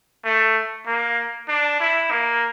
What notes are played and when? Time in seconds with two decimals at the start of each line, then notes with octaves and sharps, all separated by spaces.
0.25 A3
0.87 A#3
1.48 D4
1.80 E4
2.11 A#3